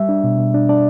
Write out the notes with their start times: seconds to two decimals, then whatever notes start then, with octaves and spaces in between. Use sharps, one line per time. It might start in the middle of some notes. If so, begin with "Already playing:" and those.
Already playing: G3 E5
0.09 D4
0.24 B2
0.38 B2
0.54 D4
0.69 D4 D5